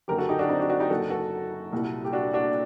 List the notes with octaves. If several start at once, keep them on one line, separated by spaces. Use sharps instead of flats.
F#1 F#2 D3 F#3 G4 A#4
F#4 A4
D#4 G4
D4 F#4
C4 D#4
D4 F#4
D4 F#4
D#4 G4
F#1 F#2 F#3 F#4 A4
F#4 A4
C2 A#2 G3
G4
D4 F#4
D4 F#4